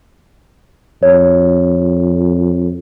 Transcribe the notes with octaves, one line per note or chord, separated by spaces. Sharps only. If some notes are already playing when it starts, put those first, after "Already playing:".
F2 C#5